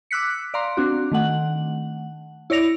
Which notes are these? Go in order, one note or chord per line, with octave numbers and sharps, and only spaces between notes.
D6 E6 F#6 B6 C#7
D5 F5 A#5 C6
C4 D4 F#4
D#3 A3 F#5
E4 C#5 D5 A#6 F7